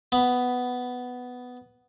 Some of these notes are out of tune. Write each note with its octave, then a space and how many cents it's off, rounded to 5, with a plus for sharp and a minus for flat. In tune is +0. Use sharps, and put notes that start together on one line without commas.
B3 +10 B5 +0